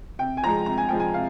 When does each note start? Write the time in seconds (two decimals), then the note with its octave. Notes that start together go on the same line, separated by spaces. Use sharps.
0.19 C3 G5
0.37 G#5
0.43 F3 G#3 A#5
0.66 C3 A#5
0.78 G#5
0.89 F3 G#3 G5
1.00 G#5
1.14 C3 F5